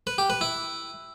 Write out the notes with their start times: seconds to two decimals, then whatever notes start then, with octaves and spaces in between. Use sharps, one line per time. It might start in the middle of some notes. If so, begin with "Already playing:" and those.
0.07 B4
0.18 G4
0.30 B4
0.41 E4